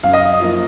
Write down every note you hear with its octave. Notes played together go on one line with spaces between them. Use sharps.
F#2 F5
D#5
D#5
F3 A#3